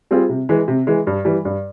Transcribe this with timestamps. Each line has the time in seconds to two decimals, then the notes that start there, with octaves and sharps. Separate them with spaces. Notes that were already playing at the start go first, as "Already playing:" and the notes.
0.11 G3 C4 F4 G#4
0.29 C3
0.49 E3 G#3
0.68 C3
0.87 E3 G#3
1.07 G2
1.25 E3 G3
1.45 G2